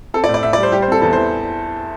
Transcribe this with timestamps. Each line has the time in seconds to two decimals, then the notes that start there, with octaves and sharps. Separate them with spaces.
0.14 C4 A4
0.24 D5
0.29 A2
0.34 D5
0.43 A2 E5
0.53 D5
0.58 G3 C5
0.72 G3 G4
0.82 C5
0.88 C4 A4
1.02 E2 A4
1.13 C5
1.17 E3